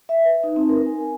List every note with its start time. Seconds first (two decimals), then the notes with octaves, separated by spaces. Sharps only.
0.09 E5
0.25 B4
0.44 D#4
0.56 C4
0.69 A#4
0.86 G#5